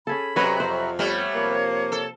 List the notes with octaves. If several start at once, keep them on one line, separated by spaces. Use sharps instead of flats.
C#4 G#4 A4 B5
C3 F#3 C#4 F#4 B4 C#5 D#5
F2 C5
G3 A3 B3 C#5
C3 F3 A#3
A4